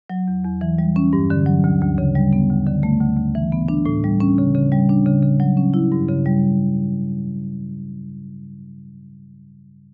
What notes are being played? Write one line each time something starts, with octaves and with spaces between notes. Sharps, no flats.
F#3
E2
E2
E3
G3
C#4
G2
D3
F#3
D2
D2
C#3
G3
B3
D2
D3
A3
D2
D2
E3
B3
D4
A2
G3
C#4
C#3
C#3
G3
D4
C#3
C#3
F#3
C#4
E4
G2
C#3
G3